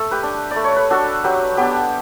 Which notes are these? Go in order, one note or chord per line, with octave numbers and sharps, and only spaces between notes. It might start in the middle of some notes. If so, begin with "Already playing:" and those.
Already playing: A3 A4
G4 B4
D4
D5
A3
C#5
B4
D4 F#4 A4
F#3 G4 B4
B3 D4 G4